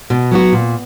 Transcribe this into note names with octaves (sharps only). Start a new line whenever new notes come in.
B2
F#3 B3 F#4
A#2